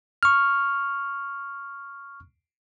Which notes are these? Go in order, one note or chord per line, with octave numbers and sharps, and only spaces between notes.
C#6 F6